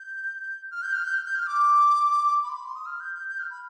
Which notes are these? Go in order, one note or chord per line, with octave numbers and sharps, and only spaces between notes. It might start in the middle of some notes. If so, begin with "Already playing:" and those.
Already playing: G6
F6
G6
F6
G6
F6
G6
F6
D6
B5
C6
B5
C6
D#6
F6
G6
G6
G6
F6
B5